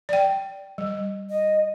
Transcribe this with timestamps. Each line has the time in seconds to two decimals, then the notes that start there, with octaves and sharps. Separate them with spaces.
0.09 D5 G5
0.78 G3
1.30 D#5